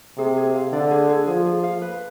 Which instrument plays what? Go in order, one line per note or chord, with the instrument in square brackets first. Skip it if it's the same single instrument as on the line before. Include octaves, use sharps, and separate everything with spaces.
[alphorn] C3 [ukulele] G#4
[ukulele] G#4
F5
[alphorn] D3 [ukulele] D5
[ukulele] G#4
G#4
[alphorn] F3 [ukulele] G#4
[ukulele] G#4
F5
B4